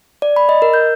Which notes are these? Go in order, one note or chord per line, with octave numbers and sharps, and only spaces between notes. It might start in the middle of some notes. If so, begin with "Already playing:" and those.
D5
B5
D#5
A#4
G6